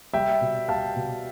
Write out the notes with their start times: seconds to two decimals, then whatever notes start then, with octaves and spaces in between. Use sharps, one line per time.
0.14 G3 E5 G5
0.41 B2
0.68 G3 F5 A5
0.96 B2